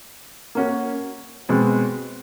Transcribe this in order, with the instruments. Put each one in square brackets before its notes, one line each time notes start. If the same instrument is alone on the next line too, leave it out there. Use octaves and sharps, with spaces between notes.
[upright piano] A#3 C#4 F#4
B2 G#3 C4